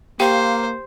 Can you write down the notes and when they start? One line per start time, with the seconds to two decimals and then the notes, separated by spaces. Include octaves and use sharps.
0.20 A#3 G4 C5 F5 G5